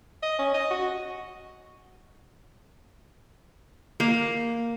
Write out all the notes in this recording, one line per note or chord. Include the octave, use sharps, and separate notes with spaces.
D#5
C#4
D#5
F#4
A#3